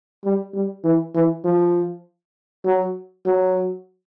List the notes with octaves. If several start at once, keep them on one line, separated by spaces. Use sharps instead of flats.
G3
G3
E3
E3
F3
F#3
F#3